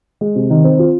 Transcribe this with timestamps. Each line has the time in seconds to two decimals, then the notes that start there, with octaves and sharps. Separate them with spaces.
0.21 G#3
0.35 C3
0.50 D#3
0.64 C4
0.79 F4